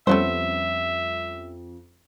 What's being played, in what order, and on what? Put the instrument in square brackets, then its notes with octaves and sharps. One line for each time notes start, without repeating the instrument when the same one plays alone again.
[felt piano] F2 [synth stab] G3 C#4 [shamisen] A3 B3 C5 [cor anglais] E5